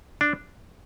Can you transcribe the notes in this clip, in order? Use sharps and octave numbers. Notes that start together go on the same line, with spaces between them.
D4